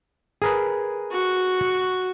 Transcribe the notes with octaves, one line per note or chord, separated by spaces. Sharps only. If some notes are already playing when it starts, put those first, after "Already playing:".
G#4 A#4 B4
F#4